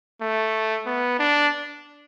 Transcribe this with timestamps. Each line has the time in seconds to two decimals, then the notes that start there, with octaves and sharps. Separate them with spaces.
0.21 A3
0.86 B3
1.19 D4